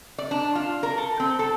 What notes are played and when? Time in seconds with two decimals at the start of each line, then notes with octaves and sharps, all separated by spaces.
0.18 D5
0.31 D4
0.55 F4
0.83 A#4
0.98 A4
1.20 C4
1.39 A4